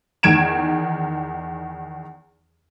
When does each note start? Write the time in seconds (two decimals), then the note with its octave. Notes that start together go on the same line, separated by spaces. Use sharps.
0.23 E2 D#3 G#6 D7 E7